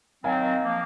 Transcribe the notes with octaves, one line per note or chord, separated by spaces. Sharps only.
D#3 F#3 C4 F5 G#5
F3 A#3